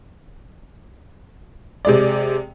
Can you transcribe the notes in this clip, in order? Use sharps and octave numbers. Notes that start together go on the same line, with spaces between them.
C3 G#3 D5